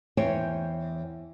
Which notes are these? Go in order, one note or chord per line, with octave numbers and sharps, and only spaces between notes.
E2 C5 C#5 G5 G#5